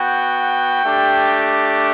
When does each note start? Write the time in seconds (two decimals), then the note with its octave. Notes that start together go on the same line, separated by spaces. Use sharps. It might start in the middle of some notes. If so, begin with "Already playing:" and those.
Already playing: B3 F#4 G5
0.83 A3 D4 G4